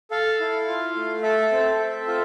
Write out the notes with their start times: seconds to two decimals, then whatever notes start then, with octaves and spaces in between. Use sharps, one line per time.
0.11 A4 F5
0.40 E4
0.68 F4
0.96 A3
1.23 A4 E5
1.52 C4
1.79 A4
2.07 F4